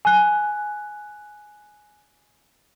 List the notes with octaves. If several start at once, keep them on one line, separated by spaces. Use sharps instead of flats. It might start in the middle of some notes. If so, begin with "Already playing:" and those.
G#5 F#6